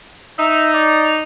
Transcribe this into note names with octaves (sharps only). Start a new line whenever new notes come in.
D#4 E5
D5